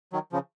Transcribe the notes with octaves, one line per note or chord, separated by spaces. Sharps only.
D#3 F#3
C#3 F3